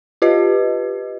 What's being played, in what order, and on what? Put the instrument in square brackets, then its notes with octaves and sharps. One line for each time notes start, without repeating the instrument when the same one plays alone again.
[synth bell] F4 G4 B4 D#5